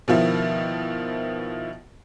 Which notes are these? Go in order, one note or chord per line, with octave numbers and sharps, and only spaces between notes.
B2 D#3 F3 E4